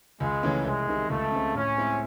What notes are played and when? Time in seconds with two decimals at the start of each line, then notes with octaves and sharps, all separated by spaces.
0.20 C#2 G#3
0.43 C#3 E3 A3 C#4
0.65 C2 G#3
0.88 C3 D#3
1.10 C#2 A3
1.32 C#3 G#3 C4
1.55 A2 C#4
1.77 G#3 C4 E4